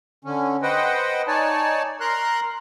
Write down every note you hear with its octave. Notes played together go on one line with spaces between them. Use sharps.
D3 C#4
B4 C5 D#5 F#5 G5
D#4 C#5 D5 G#5 A5
A#4 A#5 C6 F#6